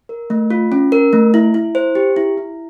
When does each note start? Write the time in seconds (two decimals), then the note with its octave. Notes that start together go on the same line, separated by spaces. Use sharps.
0.09 A#4
0.30 A3
0.50 F4
0.72 C#4
0.92 A#4
1.13 A3
1.34 E4
1.54 E4
1.75 C5
1.95 G4
2.16 E4
2.37 E4